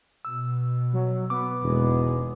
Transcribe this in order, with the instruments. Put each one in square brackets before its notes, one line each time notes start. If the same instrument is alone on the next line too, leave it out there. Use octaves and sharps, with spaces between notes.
[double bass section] B2 [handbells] E6
[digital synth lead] F#3
[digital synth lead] B3 [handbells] D6
[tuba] E1 [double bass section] D#2 G#3